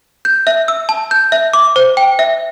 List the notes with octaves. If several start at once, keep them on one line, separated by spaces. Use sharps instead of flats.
G6
E5
E6
A5
G6
E5
D6
C5
G5
E5